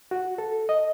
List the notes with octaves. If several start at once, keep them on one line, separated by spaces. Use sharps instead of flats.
F#4
A4
D#5